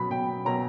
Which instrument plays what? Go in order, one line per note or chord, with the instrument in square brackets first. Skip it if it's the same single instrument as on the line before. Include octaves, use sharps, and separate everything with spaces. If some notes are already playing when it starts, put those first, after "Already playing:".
Already playing: [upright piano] B2 F#3 B5
B2 F#3 G5
B2 F#3 A#5